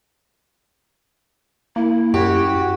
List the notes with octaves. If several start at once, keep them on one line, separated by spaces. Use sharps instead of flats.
A#3 E4
F#2 F#4 G4